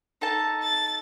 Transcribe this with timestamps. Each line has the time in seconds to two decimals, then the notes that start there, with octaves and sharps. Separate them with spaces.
0.21 D#4 A4 A5
0.62 A6